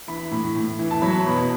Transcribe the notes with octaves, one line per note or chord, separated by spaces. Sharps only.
E3 B5
A2
A2
E3
A5
F#3 B5
B2